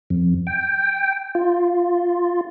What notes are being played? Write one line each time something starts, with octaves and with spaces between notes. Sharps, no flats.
F2
G5
F4